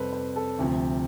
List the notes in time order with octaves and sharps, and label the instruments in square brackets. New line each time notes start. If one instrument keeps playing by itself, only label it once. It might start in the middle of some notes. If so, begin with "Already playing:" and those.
Already playing: [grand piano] F2 C3 G3 A4 B4 C5
B4
A4
D2 C3 F3